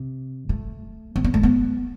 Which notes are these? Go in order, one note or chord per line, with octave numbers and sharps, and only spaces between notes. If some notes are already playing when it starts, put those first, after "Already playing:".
Already playing: C3
A3
C4
B3
A3
B3